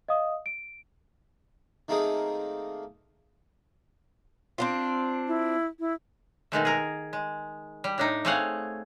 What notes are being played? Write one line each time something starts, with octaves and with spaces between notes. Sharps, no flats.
D#5 F5 D#6
D7
D#3 A3 A#3 C4 G#4 D#6
C4 D4 F4
E4
E4
B2 D#3 G#3 A3
G#4 A#4
G#3
G3
A2 D4 D#4
A3 C4 G#4 C#5 F5 F#5